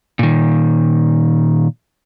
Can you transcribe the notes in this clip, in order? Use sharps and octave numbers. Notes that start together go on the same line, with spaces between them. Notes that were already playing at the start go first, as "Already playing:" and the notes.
A#2 D#3